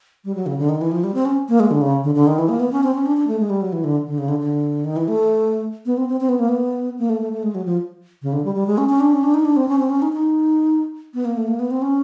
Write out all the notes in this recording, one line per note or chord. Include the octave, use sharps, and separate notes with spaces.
G3
F#3
C#3
D3
D#3
E3
F3
G3
C4
C#4
A#3
G#3
D3
C#3
D3
D3
D#3
E3
A#3
B3
C#4
C4
C#4
D4
D4
A3
G#3
G3
F#3
E3
D3
D3
C#3
D3
D3
D#3
E3
A3
B3
C4
C4
C4
B3
A#3
B3
A#3
A3
A3
A3
G#3
F#3
F3
C#3
D3
G3
G3
G#3
C#4
C#4
D4
C#4
D4
D#4
D4
C4
C#4
C4
C#4
D#4
D#4
B3
A#3
A3
A#3
B3
C4
C#4